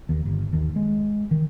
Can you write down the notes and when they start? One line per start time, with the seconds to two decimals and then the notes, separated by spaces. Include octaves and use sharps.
0.09 D#2
0.25 G1
0.53 D#2
0.76 G#3
1.31 D#3